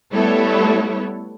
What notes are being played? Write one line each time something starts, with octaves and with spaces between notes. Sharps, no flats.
G3 A3 B3 E4 A4 C#5